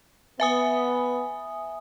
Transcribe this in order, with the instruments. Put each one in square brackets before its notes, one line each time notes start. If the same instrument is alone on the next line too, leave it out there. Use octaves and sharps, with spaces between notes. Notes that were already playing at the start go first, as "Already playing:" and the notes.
[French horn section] B3 [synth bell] E5 G#5 D#6